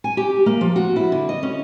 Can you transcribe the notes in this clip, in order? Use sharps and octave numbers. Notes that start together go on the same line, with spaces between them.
G#5
G4
A#3
F3
F#4
E4
D3
D#5
C#4